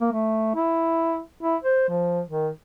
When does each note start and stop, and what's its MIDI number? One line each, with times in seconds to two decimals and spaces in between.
0.01 0.10 58
0.12 0.53 57
0.55 1.22 64
1.43 1.56 64
1.64 1.86 72
1.89 2.21 53
2.29 2.50 51